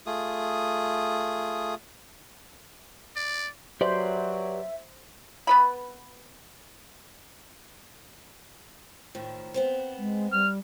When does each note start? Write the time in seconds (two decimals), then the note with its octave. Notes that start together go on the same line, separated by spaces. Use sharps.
0.06 A3 F4 G#4 D#6
3.16 D5
3.81 F#3 G4 B4 C5 D5 E5
5.47 B3 B4 B5
9.15 A2 D#3 F3
9.54 B3 C4 C5
9.98 G#3
10.32 G3 F6